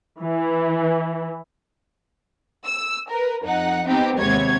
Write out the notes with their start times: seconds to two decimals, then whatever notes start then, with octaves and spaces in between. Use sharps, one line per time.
0.20 E3
2.65 E6
3.09 A#4 B4
3.43 F2 D#4 F#5
3.86 B3 C4 D#4 G4
4.18 D#2 C3 G#3 B3 C#5 G#6